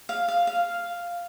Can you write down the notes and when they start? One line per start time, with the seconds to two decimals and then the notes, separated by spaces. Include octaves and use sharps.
0.09 F5
0.28 F5
0.47 F5